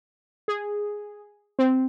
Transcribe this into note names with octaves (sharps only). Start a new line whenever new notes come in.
G#4
C4